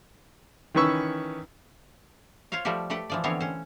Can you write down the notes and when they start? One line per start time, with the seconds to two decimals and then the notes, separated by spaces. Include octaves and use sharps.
0.75 D#3 E3 C#4 B4 C#6 E6
2.52 F4 C5 C#5 F5
2.65 F3 G3 A3 F#4 G4
2.90 A3 G4 B4 F#5 G5
3.10 E3 F3 D5
3.24 D3 E3 B3 C4 C#5 F5
3.40 C#4 C5